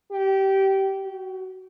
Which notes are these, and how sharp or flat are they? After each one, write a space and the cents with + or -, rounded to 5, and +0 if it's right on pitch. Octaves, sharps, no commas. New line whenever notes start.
G4 -20
F#4 +20